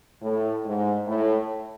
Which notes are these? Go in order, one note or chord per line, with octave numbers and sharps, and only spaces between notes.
A2
G#2
A2